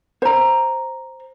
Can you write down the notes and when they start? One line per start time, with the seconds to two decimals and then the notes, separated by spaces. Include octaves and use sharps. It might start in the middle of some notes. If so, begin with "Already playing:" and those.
0.22 C5 A#5